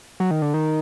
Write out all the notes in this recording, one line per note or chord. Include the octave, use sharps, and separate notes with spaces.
F#3
D#3
D3
D#3